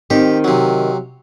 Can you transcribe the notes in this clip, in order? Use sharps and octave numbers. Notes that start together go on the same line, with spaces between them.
D#3 C4 D#4 G4
C3 F#3